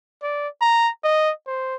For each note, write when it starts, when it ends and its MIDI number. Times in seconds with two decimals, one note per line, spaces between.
0.23 0.48 74
0.62 0.90 82
1.04 1.31 75
1.47 1.77 72